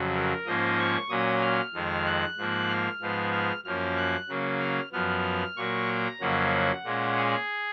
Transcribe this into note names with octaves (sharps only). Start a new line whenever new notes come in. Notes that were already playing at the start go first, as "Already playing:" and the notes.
Already playing: F2 C#3 F#3
A#4
G#2 F3 A#3 C#4 D#5
C#6
A#2 F#3 C#4 D#6
F6
F2 D#3 G#3
F#6
G#2 F3 A#3
F6
G#2 F3 G#3 B3
F6
F#2 F3 A#3 C#4 F6
F#6
C#3 F#3 A#3 C#4
F6
F#2 F3 B3 F6
A#2 F#3 A#3 C#6
A#5
F2 C#3 F#3 A#3 C#4 F#5
A#2 G#3 C#4
G#4